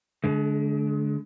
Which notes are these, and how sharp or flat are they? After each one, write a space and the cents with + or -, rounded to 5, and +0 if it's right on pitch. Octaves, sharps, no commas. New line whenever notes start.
D3 -20 G#3 +35